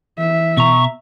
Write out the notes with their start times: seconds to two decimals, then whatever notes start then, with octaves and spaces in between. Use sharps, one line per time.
0.18 E3 E5
0.57 B2 A#5 C#6